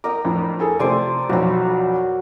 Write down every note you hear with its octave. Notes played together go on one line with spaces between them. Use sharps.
A#4 D#5 G5 D6
F2 A2 D4
G#4 A4 G#5
C3 F3 A3 C5 D5 G#5
B1 F2 F#3 F#4